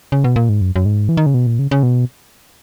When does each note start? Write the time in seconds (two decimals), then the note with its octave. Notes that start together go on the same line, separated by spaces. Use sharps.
0.12 C#3
0.24 B2
0.36 A#2
0.49 G#2
0.61 F#2
0.76 F#2
0.86 G#2
1.09 E3
1.17 D#3
1.26 C#3
1.34 B2
1.46 A#2
1.59 C#3
1.71 C#3
1.83 B2